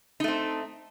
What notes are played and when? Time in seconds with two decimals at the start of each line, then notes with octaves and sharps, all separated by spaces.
0.20 D#4
0.24 A3
0.28 C4